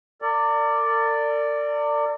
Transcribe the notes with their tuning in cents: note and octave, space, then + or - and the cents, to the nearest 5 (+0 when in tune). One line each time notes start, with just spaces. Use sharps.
A#4 -45 D5 +0